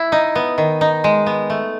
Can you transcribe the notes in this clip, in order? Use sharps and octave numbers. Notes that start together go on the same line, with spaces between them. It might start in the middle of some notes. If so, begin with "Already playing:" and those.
Already playing: E4
D#4
B3
D#3
D#4
G#3
B3
A3